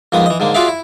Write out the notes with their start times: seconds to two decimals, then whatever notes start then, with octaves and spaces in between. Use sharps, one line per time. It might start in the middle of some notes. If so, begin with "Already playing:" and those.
0.12 F2 G#2 A#3 B3 D#6
0.26 E3 D#5
0.40 G#2 D3 A#3
0.54 F4 F#4 G#4 D5 E5 F5
0.68 E4